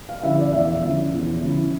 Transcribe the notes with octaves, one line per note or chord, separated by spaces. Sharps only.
F5
D3 F3 C#4 E4 E5
D5
E2 E5
D3 F3 C#4 E4
E2
D3 F3 C#4 E4